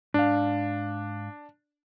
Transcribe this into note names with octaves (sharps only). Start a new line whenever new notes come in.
G#2 D4 F5